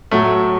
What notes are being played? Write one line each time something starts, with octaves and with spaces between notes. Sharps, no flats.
A2 F#3 A3